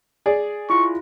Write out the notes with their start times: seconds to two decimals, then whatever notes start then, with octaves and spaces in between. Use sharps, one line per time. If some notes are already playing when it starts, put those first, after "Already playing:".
0.26 G#4 D5
0.70 E4 F4 C#6